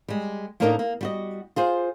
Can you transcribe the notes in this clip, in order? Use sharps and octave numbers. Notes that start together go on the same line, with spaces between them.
G3 G#3
A2 A#3 D4 D#4 A#4 D#5
A#3
G3 F#4 D#5
F4 G#4 C5